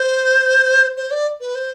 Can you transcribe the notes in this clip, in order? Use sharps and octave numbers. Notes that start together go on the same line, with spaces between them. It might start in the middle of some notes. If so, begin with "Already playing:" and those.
Already playing: C5
C5
D5
B4
C5